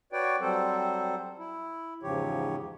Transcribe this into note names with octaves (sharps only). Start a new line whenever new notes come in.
F#4 B4 C#5 D5 G5
F#3 G3 C4 A4 C5
E4
E2 G#2 C#3 F3 G4 C#5